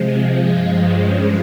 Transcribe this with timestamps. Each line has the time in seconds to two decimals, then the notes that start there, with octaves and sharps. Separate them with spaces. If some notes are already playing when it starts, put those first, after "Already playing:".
Already playing: C3 F3 G#3
0.40 G2 F3 G#3 F4
0.96 C#4